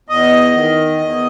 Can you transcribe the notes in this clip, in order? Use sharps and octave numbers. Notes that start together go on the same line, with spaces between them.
E2 D#5
D#3
E2